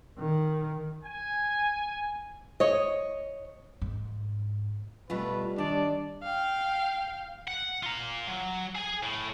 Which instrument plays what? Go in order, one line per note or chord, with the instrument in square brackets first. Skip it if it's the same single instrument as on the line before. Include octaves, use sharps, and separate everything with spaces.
[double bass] D#3
[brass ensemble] G#5
[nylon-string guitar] C#5 D#5
[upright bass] G#2
[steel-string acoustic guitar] B2 A3 F4 [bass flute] G3 [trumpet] B4
[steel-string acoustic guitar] D#3 A5 [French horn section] D4 [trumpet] D5
[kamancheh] F5 G5
[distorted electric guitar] F#5
F4 A#5
F#3
G#4 G#5
A2